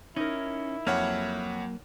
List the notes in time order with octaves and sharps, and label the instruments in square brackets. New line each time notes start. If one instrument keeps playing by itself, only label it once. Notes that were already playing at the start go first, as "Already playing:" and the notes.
[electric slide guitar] C#4 [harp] D#4 A#4 [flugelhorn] E4
[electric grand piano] F2 C#5 F#5 [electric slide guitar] F#3 A#3 [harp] F6